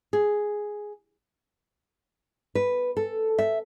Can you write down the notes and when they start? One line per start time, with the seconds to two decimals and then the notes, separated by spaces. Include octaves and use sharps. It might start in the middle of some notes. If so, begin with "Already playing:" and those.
0.13 G#4
2.55 B4
2.97 A4
3.38 E5